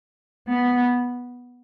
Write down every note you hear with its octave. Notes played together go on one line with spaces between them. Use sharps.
B3